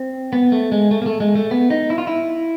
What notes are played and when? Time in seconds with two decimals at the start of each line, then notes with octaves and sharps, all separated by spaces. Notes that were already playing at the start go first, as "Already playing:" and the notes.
Already playing: C4
0.33 B3
0.52 A3
0.72 G#3
0.91 A3
1.02 A#3
1.06 A3
1.20 G#3
1.36 A3
1.51 B3
1.70 D#4
1.90 E4
1.98 F4
2.07 E4